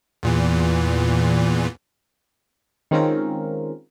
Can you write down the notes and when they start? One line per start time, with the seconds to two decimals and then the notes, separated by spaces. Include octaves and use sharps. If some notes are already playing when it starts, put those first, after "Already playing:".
0.23 E2 A#2 E3
2.91 D#3 G#3 C4 C#4 F4 A#4